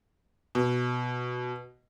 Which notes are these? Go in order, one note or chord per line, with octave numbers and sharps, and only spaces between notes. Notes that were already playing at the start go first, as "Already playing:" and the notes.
B2